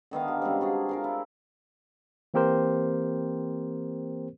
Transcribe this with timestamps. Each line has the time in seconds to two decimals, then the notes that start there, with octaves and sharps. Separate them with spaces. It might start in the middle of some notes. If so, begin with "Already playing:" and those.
0.11 D3 D#3 B3 F5
0.28 G4
0.42 C#3 G3 G#3 C4
0.61 D4 F#4 G#4 A#5
0.89 F4 A#4 F5
1.04 E4
2.34 E3 A#3 C4 G4 A#4 C5